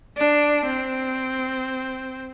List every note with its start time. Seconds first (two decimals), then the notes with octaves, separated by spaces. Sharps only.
0.17 D4
0.66 C4